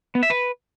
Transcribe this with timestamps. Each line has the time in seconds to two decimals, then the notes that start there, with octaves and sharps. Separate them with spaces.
0.15 B3
0.23 E5
0.30 B4